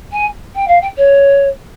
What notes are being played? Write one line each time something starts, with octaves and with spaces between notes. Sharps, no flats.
G#5
G5
F5
G5
C#5